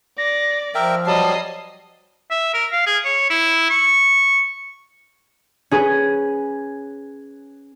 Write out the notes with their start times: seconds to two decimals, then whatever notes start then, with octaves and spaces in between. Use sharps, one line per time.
0.18 D5 A#6
0.75 F3 A#4 E5 G5
1.06 F#3 G3 D#5 A5 C7
2.31 E5
2.54 A#4
2.72 F5
2.87 G#4
3.05 C#5
3.30 E4
3.70 C#6
5.71 C#4 G#4 B4